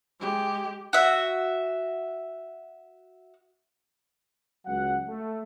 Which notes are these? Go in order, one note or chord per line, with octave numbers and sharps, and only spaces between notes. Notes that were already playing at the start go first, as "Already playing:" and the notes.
G#3 G4
F#4 E5
C#2 F#3 F#5
A3